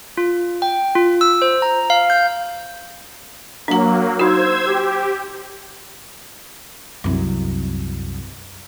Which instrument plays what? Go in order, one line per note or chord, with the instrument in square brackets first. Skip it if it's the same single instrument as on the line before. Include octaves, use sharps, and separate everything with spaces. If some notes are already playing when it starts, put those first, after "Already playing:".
[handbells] F4
G5
F4
E6
C5
A#5
F5
G6
[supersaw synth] F#3 A#3 [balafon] D4 A#5
[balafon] D#4 F#4 [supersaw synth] C5 E6 G#6
[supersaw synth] G4
[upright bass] C2 F#2